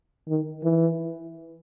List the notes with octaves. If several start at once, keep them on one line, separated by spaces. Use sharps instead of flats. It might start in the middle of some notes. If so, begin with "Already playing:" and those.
D#3
E3